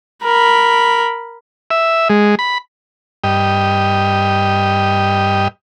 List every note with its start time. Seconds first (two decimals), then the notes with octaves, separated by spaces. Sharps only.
0.24 A#4 B5
1.71 E5
2.09 G#3
2.39 B5
3.24 G2 G4 D#5